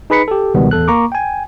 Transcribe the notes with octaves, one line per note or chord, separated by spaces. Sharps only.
D#4 G#4 B4 B5 B6 C#7
G4 A4
C#2 B2 D#3 G3 B3
A1 E2 A4 F#6
A#3 A#5 C#6 D6
G5 G#5